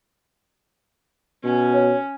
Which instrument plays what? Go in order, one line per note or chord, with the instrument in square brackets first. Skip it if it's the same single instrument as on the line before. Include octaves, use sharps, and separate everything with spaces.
[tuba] B2 [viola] C#4
[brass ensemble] C#5